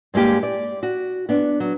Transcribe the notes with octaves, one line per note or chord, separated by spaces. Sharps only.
G2 G#3 A#3 G4
D5
F#4
B3 D4
F#3